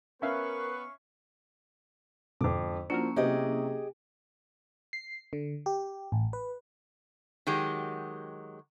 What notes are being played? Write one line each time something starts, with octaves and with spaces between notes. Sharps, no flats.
B3 C#4 A#4 B4 E5 F5 C#6
F2 G#2 B2 D3 D6
F3 A#3 C#4 D4 E4 F#4 A#4
C3 F#3 B3 C4 G4 G#4 D#5
C7
D3
G4
A1
B4
D#3 F#3 G#3 G4